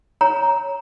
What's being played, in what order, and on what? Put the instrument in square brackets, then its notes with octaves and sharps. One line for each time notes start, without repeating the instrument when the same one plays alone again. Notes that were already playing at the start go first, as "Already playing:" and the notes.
[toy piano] C#5 A#5